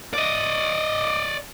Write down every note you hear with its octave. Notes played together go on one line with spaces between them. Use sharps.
D5 D#5